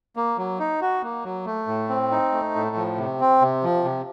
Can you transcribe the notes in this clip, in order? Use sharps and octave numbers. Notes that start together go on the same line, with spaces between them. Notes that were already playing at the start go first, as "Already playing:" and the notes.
A#3
F#3
D#4
F#4
A#3
F#3
A3
A2
C4
D#4
A3
A2
F3
C3
C4
C3
F3
C3